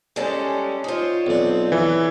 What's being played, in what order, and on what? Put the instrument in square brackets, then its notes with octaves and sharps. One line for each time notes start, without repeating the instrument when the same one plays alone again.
[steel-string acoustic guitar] G3 G4 A4 [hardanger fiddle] G#3 C#4
[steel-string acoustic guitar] D#4 F4 [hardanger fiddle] C5 C#5
[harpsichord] B1 D4 [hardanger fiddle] C4
[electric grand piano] E3